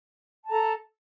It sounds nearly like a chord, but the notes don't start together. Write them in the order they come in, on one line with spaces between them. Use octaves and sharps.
A5 A#5 A4